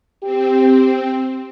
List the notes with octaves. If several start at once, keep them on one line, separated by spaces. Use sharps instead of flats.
C4 G4